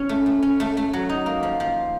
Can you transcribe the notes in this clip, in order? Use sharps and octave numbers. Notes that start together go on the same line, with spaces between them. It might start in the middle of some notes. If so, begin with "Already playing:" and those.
Already playing: C#4
A3
A3
C#4
A3
A3
F#3
D#4
A#3
F3
F3